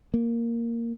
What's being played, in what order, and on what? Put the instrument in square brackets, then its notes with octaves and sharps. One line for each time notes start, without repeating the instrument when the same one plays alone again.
[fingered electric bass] A#3